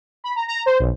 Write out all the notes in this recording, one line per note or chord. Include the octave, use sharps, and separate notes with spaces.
B5
A#5
A#5
C5
B1